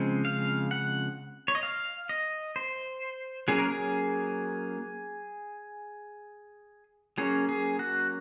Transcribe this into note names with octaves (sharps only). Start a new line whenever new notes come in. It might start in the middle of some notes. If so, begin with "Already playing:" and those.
Already playing: C#3 F3 G#3 C4
F5
F#5
C#5
D#5
F5
D#5
C5
F#3 A#3 C#4 G#4
A#4
G#4
F#3 A#3 C#4 G#4
G#4
F#4